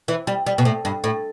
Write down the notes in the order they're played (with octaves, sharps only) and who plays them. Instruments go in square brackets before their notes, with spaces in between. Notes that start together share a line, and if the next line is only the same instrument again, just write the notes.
[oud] E3
G3
G3
B2
A2
G2
A2